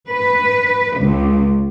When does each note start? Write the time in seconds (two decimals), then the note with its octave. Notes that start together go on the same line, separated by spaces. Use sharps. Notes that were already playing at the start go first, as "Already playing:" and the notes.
0.10 B4
1.00 C#2